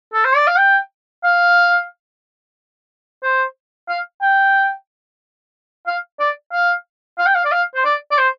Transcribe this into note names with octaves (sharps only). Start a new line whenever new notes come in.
A4
C5
D5
F5
G5
F5
C5
F5
G5
F5
D5
F5
F5
G5
F5
D5
F5
C5
D5
D5
C5